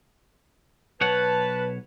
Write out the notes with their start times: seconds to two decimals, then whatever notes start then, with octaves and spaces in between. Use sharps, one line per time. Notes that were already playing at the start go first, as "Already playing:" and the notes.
1.01 B1 B4 C#5 F#5 A5